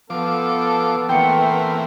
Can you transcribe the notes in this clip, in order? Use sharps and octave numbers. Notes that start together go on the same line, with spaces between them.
F3 B3 A4 D6
E3 A3 A#3 C4 G5 C#7